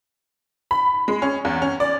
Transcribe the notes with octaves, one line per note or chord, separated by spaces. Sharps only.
B5
G#3
C#4
E2
C#4
D5